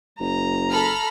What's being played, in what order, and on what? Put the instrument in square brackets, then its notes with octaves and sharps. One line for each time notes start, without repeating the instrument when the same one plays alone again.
[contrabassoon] F#1 [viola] A#5
[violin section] A4 B5 F6